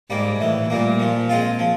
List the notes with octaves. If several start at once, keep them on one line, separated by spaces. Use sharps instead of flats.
G#2 G3 A#3
A2 E3
A#2 G3 A#3
F3
G#3 C4 F4
F3